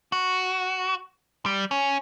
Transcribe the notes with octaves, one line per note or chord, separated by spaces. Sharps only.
F#4
G3
C#4